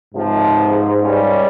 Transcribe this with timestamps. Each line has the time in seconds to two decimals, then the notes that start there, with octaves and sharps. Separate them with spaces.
0.14 C#2 G#2 C3 F3
0.99 C#2 C#3 G3 C#4